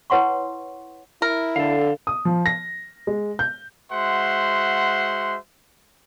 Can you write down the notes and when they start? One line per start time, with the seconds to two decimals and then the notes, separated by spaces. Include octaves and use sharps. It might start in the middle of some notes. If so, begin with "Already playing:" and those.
0.10 E4 B4 C#5 F#5 C6 C#6
1.22 E4 A#4
1.56 D3 A4 F5
2.07 D#6
2.25 F3
2.46 A#6
3.07 G#3
3.39 G6
3.92 G#3 F#4 C5 E5 F#5 C6